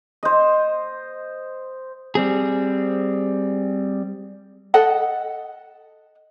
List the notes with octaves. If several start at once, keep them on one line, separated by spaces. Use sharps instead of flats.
C5 D#5
G3 C4 G#4
A4 D#5 F#5